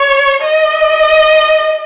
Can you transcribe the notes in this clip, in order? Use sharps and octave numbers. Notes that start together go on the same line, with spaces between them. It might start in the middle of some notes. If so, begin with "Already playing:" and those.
Already playing: C#5
D#5